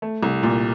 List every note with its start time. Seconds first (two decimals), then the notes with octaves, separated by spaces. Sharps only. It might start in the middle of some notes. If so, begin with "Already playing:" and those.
0.02 A3
0.23 C2
0.43 A#2